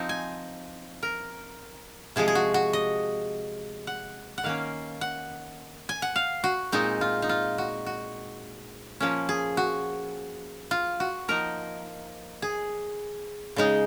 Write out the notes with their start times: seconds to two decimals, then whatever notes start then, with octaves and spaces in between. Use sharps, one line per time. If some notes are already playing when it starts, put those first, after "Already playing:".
Already playing: F3 C4 D#4
0.09 G#5
1.03 A#4
2.16 C3 F3 G#3 G#4
2.28 G#4
2.35 F#4
2.54 F#4
2.73 D#5
3.87 F#5
4.38 F#5
4.43 D#3 A#3 C#4 F5
5.01 F#5
5.89 G#5
6.02 F#5
6.16 F5
6.44 F#4
6.72 A#2 G#3 C4 D#4
7.01 F4
7.22 D#4
7.29 F4
7.58 F#4
7.86 F#4
9.00 F3 A#3 C#4
9.29 G#4
9.57 F#4
10.71 F4
11.00 F#4
11.28 F3 A#3 D#4 A#4
12.42 G#4
13.56 C#3 G#3 D#4